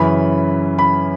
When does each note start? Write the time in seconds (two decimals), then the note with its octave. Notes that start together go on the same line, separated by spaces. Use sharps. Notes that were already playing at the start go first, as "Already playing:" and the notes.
Already playing: F#2 C#3 E3 B5
0.79 B5